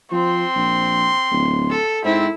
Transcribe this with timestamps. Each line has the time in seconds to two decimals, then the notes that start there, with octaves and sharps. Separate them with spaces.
0.12 F3 C4 C6
0.56 A#1
1.31 D1
1.71 A4
2.05 G#2 C4 E4